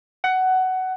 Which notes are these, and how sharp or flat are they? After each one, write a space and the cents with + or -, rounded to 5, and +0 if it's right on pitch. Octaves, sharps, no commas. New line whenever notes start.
F#5 +15